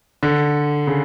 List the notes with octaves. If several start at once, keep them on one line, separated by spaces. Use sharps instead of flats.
D3
C#3